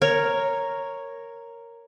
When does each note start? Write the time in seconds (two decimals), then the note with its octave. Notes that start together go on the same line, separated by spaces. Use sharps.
0.02 A#4 C#5